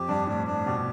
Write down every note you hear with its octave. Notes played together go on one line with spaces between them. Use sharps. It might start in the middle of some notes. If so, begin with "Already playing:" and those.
Already playing: F2 G4
G2 D4
A2 D4
A2 D4
B2 G4